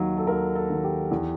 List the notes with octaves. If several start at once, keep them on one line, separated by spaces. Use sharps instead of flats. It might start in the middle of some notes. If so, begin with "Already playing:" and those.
Already playing: D#2 D#3 F#3
A4
D#2 A#4
A4
D#3 F#3
G4
E2